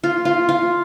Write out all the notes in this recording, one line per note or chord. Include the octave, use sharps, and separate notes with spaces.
F4
F4
F4